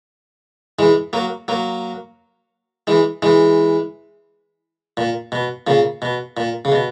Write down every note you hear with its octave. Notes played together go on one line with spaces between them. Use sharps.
E3 G#3
F#3 A#3
F#3 A#3
E3 G#3
E3 G#3
A#2
B2
A#2 C#3
B2
A#2
C#3
B2